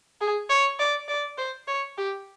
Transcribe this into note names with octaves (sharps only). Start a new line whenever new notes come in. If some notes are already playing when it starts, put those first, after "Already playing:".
G#4
C#5
D5
D5
C5
C#5
G4